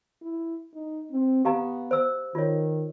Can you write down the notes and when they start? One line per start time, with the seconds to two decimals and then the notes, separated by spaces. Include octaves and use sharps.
0.22 E4
0.74 D#4
1.12 C4
1.45 B3 G4 F5 A#5
1.91 C5 E6
2.35 D#3 F4 C#5